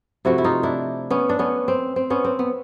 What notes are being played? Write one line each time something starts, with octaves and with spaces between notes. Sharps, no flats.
C3 F3 A3 E4 F#4
E4
D#4 F4
D4 E4
B3 C#4
D4
B3 C#4
C4
C4
B3 C#4
C4
B3